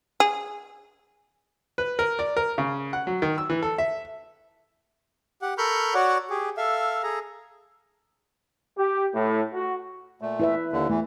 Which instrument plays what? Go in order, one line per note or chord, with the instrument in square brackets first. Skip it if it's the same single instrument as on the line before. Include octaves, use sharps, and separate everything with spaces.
[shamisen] G#4
[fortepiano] B4
A#4
D5
A#4
C#3
F#5
F#3
D#3
E6
E3
A4
E5
[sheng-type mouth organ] G4 F#5
A4 A#4 B5 C#6 F6 G6
F#4 C#5 D5 F#5
G4 G#4
A4 E5 F5
G#4 A4 A#5
[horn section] G4
A2
F#4
[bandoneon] A#2 A3
[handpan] E4 B4 E5
[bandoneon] D#2 D3
[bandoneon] E2 E3 [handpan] A3